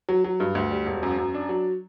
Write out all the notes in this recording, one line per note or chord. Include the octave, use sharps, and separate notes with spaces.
F#3
F#3
G2
D2
G3
E1
F#2
F#2
D4
F#3